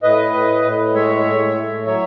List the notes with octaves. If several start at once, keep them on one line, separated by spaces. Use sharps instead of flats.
A2 B4 D#5
A2
A2
G#3 C#5 E5
A2
A2
F#3 C#5 E5